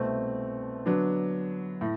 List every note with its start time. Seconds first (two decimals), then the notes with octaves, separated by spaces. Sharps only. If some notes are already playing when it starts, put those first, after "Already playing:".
Already playing: C2 B2 A3 C4
0.86 D3 F#3 B3 D4
1.81 A2